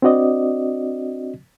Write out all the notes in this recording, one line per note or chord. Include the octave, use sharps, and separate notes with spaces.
C4 D4 F#4 D5 D#5